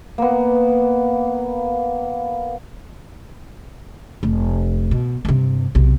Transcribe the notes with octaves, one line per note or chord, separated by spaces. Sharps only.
A#3 B3
F1
B2
G2 C3
B1 C3